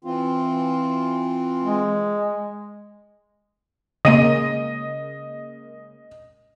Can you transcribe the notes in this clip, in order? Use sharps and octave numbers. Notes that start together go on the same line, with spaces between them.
E3 C4 F4
G#3
C#3 G#3 A#3 D#5 D#7